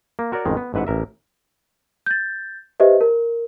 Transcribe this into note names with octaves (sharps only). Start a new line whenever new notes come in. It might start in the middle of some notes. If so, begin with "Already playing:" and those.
A#3
F#4 A#4 C#5 D5
A1 F2 D#3 G#3
B3
A1 G#2 B4 E5 F#5
A1 A#4 E5
G6 A6
G4 B4 C5 D#5 E5
A#4